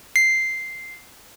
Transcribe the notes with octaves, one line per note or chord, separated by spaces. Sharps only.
C7